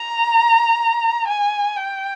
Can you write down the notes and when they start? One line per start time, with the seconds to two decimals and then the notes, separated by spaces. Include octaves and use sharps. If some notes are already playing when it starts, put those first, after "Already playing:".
Already playing: A#5
1.28 G#5
1.77 G5